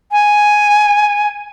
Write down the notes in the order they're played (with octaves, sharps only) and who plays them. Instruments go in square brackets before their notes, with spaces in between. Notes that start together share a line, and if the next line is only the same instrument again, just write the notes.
[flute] G#5